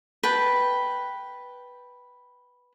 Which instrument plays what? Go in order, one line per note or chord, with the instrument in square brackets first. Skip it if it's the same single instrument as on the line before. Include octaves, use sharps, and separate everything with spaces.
[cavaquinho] B4 G5 A5